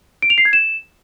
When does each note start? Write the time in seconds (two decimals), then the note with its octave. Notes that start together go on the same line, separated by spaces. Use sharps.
0.22 D7
0.30 F7
0.38 C7
0.45 G#6
0.53 E7